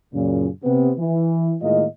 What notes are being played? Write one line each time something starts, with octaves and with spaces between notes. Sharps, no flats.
F#2 A#2 C#3
C3 B3
E3
A2 D#3 G#3 A#3 F4 D#5